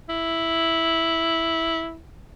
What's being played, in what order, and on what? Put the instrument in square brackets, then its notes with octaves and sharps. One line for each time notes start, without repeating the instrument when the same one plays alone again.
[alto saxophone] E4